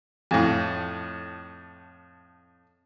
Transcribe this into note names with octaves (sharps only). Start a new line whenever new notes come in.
F2 A2